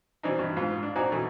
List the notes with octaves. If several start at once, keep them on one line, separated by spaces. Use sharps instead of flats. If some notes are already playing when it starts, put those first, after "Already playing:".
B2 E3 C4 D4 D#4
G2
G#2 F4
D4
C4 D#4 F#4 D5 G#5 A#5
B2 E3 A3